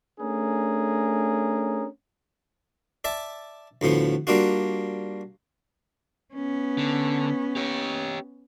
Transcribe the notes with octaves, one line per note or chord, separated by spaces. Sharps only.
A3 C#4 D4 G#4 A#4
D5 E5 A5
D2 A2 F3 B3
G3 A#3 D4 F4 F#4
B3 C#4
D3
G4 C#5